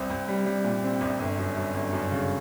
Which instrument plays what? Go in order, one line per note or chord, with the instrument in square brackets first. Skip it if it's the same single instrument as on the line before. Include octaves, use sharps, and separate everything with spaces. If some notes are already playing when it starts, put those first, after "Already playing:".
Already playing: [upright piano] C2 C4
C2
G3
G3
A#2
C4
C2
G1
F#2
F#2
G1
F#2
C#3